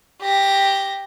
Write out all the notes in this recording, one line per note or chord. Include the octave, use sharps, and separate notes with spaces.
G4 A#6